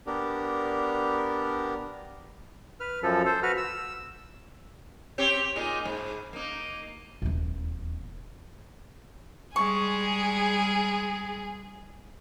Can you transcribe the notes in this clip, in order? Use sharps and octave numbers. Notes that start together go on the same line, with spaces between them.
B3 D4 G4 A#4
B4 F6
F#2 F3 A4
A4 C5
F#4 B4 F6
E6
C4 G4 C#5
A#2 D#4 G#4
G#2
A#3 D#4
D#1 E2
G3 G#3 G#4 C#6